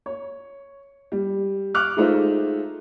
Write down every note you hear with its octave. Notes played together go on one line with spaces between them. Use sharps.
C#5
G3
C#6 D6 F6 F#6
G#3 A3 D#4 F4 C5 E5